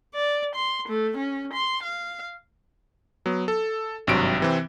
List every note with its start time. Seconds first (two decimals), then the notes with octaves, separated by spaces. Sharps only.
0.15 D5
0.55 C6
0.88 A3
1.17 C#4
1.53 C6
1.83 F5
3.26 F#3 B3
3.48 A4
4.07 G#1 G2 C3 F#3 D7
4.40 C3 E3 C4